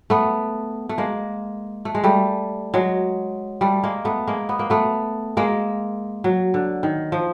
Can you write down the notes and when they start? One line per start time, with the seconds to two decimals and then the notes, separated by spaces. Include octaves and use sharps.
0.10 A3 B3
0.89 A3
0.98 G#3 A#3
1.85 A3
1.95 G#3
2.04 G3 A3
2.74 F#3 G#3
3.61 G3 A3
3.83 G#3 A#3
4.05 A3 B3
4.27 G#3 A#3
4.49 B3
4.59 A#3
4.70 A3 B3
5.37 G#3 A#3
6.24 F#3
6.54 D3
6.83 D#3
7.12 F3